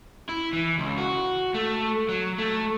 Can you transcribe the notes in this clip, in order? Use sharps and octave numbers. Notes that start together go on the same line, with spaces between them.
E4
E3
C#2
F#4
A3
F#3
A3